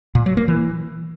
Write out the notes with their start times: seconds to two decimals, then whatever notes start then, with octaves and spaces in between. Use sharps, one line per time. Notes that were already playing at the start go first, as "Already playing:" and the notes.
0.15 A#2
0.26 F#3
0.37 A#3
0.48 E3